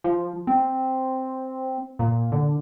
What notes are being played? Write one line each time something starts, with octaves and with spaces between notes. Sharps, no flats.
F3
C4
A#2
D3